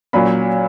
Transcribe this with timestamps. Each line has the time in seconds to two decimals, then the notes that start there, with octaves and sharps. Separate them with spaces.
0.13 A#2 F#3 C#4 B5